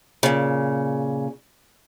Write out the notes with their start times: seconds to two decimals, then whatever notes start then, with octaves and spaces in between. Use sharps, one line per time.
0.23 A#2 C#3